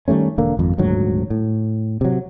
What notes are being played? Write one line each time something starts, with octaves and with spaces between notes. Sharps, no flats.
D#3 G3 A3 C#4
E1 D3 A#3
G#1 F2
D#1 D2 G#2 F#3
A2
C3 F#3